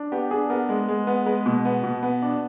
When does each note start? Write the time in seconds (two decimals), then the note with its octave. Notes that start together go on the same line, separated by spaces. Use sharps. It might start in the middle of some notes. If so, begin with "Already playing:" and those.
Already playing: D4
0.12 B3 G4
0.31 D4 G#4
0.50 B3 A#4
0.69 G#3
0.88 G#3
1.07 B3
1.26 G#3 B4
1.46 B2
1.65 B3
1.84 B2
2.03 B3
2.22 D4